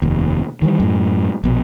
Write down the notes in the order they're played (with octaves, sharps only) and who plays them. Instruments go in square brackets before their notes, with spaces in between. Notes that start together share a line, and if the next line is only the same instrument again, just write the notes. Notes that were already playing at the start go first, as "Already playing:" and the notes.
[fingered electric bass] F1 D#2
D#3 E3 F#3 G3
F#2 A2
A#1 B2